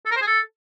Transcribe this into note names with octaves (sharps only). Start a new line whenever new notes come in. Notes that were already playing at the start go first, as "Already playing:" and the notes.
A4
A#4
C5
G#4
A4